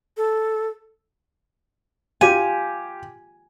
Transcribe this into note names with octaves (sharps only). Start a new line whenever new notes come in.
A4
F4 G4 G#5